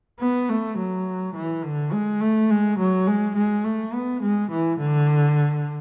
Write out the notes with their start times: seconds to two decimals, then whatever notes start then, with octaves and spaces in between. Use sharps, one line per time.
0.20 B3
0.49 A3
0.78 F#3
1.35 E3
1.64 D3
1.92 G#3
2.21 A3
2.50 G#3
2.79 F#3
3.07 G#3
3.36 G#3
3.65 A3
3.94 B3
4.22 G#3
4.51 E3
4.79 D3